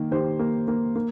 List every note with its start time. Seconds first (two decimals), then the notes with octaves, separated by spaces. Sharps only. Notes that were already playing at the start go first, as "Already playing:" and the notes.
Already playing: D#3 A#3
0.11 D#3 G4 C5
0.39 A#3
0.68 A#3
0.95 A#3